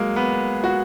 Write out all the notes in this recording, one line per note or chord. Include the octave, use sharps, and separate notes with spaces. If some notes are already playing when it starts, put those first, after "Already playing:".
Already playing: F#3 G#3 A#3
B3
F#4